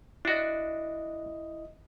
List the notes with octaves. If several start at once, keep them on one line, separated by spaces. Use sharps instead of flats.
D4 E4 F#4 D#5